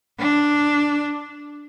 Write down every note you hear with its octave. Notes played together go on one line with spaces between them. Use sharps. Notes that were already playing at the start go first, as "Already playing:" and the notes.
D4